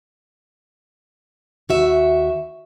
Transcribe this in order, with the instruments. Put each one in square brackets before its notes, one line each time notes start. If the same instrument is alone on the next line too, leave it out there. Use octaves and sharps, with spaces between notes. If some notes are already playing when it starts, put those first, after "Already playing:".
[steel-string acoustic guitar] D#2 F#4 E5